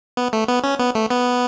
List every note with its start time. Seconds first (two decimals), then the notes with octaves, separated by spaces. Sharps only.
0.17 B3
0.33 A3
0.48 B3
0.64 C#4
0.79 B3
0.95 A3
1.10 B3